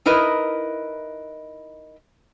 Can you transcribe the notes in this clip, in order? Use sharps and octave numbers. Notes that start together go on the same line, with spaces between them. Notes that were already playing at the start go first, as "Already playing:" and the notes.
D#4 E4 A#4 B4 D#5